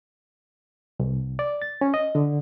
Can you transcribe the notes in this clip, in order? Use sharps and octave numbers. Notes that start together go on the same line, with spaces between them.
C2
D5
A6
C#4
D#5
D3